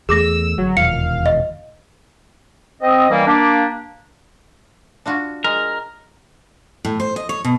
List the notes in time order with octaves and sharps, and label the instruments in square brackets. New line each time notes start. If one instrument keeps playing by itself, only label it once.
[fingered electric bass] E2 A3 [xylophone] G#4 D6 A#6 [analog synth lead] E6
[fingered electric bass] G1 [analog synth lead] F#3
[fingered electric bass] E1 D#2 A#2 [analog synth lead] F5 [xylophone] C#7
[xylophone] D#5
[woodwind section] C4 D#5
D#3 E3 G3 A#3
A#3 D4 G4
[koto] D4 F4 F#4
[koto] G#3 [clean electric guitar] A#4
[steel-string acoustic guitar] A2
C5
D#5
C#5
B2